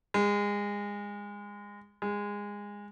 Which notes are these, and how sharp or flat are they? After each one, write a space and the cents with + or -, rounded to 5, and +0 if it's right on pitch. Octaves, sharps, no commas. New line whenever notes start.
G#3 -25
G#3 -20